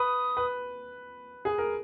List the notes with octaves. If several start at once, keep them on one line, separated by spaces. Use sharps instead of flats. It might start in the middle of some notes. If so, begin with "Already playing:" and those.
Already playing: B4 D#6
B4
G#4
A#4